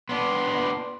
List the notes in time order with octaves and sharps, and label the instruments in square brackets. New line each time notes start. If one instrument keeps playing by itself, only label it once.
[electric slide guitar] B3 D4 [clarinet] C6